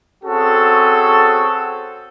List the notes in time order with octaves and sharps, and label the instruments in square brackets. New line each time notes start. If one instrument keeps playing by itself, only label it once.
[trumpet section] C4 C#4 F#4 G#4 A4